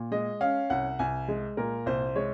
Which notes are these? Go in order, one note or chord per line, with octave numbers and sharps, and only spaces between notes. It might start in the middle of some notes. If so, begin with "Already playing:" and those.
Already playing: A#2
G#3 D#5
C#4 F5
C2 F#5
C2 G#5
G#3
A#2 A#4
C2 C5
G#3 C#5